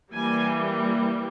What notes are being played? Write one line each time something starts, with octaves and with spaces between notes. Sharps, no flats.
E3 G3 A#3 G#5